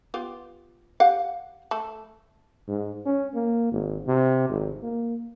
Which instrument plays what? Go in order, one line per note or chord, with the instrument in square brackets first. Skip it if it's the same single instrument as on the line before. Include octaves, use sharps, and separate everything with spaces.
[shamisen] B3 F4 G4
G4 F5 F#5
A3 A4
[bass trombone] G#2
C#4
A#3
G#1
C3
G#1
A#3